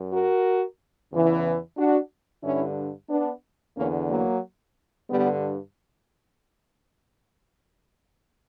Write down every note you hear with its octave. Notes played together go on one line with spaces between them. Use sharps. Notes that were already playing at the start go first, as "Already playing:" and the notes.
Already playing: F#2
F#4 A#4
E2 C#3 E3
D4 F#4
G2 D3 C#4 E4
B3 D4
E2 D3 A#3 C#4
F#3 A#3
G2 D3 G3 B3